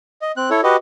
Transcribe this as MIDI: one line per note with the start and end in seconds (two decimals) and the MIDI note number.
0.22 0.32 75
0.37 0.50 60
0.37 0.50 90
0.50 0.61 64
0.50 0.61 69
0.50 0.61 73
0.63 0.76 66
0.63 0.76 67
0.63 0.76 71
0.63 0.76 75